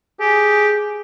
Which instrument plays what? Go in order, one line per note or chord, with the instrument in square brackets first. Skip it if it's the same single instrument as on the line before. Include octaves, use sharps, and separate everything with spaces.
[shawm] G4 [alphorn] G#4